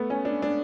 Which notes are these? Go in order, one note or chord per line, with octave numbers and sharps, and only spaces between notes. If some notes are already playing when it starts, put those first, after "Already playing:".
Already playing: A3 B3
C#4
D4
D4